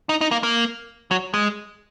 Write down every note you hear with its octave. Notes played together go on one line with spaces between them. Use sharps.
D#4
D#4
A#3
A#3
F#3
G#3